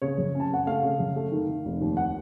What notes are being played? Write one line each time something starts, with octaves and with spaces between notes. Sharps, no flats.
C#3 C#5
F#2
C#4 A5
C#3 F#5
A3 F5
C#3
F#2
A3
D#3
D#3
F1
D#2
F#5